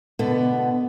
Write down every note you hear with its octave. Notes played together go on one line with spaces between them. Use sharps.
B2 D3 B3